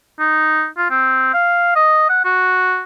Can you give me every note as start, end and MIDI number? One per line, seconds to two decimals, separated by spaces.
0.20 0.67 63
0.77 0.89 65
0.90 1.32 60
1.34 1.72 77
1.76 2.07 75
2.09 2.21 78
2.25 2.83 66